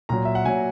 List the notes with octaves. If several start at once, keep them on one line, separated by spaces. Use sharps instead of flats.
A#2 F#3 A#5
E5
F#5
A#2 F#3 G#5